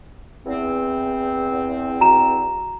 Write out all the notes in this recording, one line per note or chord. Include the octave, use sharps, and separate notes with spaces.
E2 C4
F#4 A#5 E7